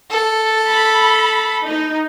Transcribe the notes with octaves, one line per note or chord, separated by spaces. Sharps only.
A4
B5
D#4